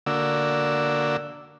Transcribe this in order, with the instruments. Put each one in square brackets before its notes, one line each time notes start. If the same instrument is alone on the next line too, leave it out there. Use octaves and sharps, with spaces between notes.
[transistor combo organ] D3 A#3 F#4 D5 E6